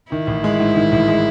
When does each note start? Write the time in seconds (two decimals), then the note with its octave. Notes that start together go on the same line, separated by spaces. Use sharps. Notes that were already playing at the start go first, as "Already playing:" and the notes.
0.12 D#3 E4
0.27 A1
0.44 G#3
0.60 G#2
0.76 D#3
0.92 A1
1.08 G#3